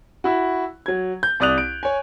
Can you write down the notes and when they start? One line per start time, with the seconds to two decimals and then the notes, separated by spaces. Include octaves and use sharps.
0.24 E4 F#4
0.86 F#3 G#6
1.23 G6
1.40 C2 D5 D#6 F#6 F7
1.58 D7
1.83 C#5 G#5